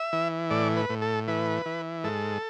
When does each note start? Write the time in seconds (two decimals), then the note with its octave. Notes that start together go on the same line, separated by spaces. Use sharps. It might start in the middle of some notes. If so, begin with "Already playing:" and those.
Already playing: E5
0.13 E3
0.50 A2 D5
0.77 B4
0.90 A2
1.02 A4
1.28 E3 B4
1.66 E3
2.04 G#2 A4